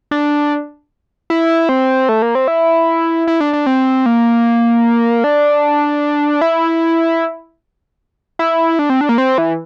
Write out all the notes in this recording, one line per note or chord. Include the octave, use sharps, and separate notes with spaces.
D4
E4
C4
A3
A#3
C4
E4
E4
D4
D4
C4
A#3
D4
E4
E4
D4
C4
D4
A#3
C4
E3